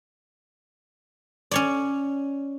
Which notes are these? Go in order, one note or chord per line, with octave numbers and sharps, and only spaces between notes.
C#4 C#5 D5